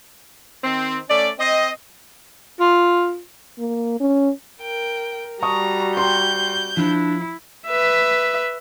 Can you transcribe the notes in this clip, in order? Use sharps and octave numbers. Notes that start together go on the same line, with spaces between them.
D#3 C4
A3 C#4 D5
C4 D#5
F4
A#3
C#4
A#4 G5
G3 F#4 A5 A#5 C#6 D#6
G5 A#5 C6 G6
F3 D4 E4
B4 E5